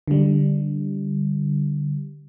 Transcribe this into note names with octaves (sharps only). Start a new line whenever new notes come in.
D3 G3